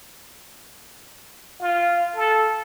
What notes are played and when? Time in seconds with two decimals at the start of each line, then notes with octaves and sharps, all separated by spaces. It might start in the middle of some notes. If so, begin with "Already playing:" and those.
1.61 F4
2.16 A4